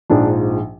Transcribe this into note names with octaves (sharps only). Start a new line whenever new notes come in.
A#1 G#2 F3 D4